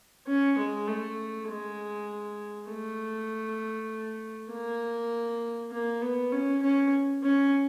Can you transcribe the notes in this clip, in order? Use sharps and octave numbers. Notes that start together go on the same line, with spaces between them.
C#4
G#3
A3
G#3
A3
A#3
A#3
B3
C#4
C#4
C#4